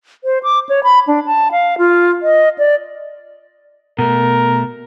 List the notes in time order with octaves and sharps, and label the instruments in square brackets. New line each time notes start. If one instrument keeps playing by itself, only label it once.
[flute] C5
D6
C#5
B5
D4
A5
F5
F4
D#5
D5
[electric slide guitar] B2 A3 [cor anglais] A#4